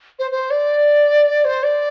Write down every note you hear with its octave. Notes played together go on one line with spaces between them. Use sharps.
C5
C5
D5
C5
D5